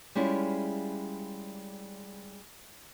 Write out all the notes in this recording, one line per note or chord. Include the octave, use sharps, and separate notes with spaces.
G3 G#3 C#4 E4 F4